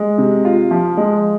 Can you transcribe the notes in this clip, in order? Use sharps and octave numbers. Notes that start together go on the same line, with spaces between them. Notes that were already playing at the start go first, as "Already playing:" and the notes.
Already playing: G#3
C3
F4
F3
G#3